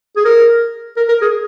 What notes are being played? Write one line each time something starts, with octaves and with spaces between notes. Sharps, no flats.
G#4
A#4
A#4
A#4
G#4